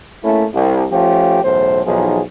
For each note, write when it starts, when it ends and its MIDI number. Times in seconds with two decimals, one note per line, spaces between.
0.25 0.45 57
0.25 0.45 58
0.25 0.45 61
0.25 0.45 64
0.54 0.85 36
0.92 1.39 53
0.92 1.39 57
0.92 1.39 61
0.92 1.39 65
0.92 1.39 67
1.44 1.81 35
1.44 1.81 40
1.44 1.81 45
1.44 1.81 72
1.85 2.20 35
1.85 2.20 40
1.85 2.20 53
1.85 2.20 63
1.85 2.20 68